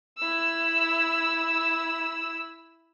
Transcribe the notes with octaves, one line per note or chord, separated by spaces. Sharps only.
E4 E6